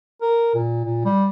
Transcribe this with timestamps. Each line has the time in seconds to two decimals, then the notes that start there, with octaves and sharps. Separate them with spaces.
0.22 A#4
0.55 A#2
0.85 A#2
1.05 G3